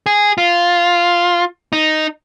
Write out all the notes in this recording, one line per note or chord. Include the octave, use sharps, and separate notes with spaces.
G#4
F4
D#4